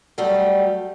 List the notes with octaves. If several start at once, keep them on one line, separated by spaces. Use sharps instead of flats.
F#3 G3 A3 G4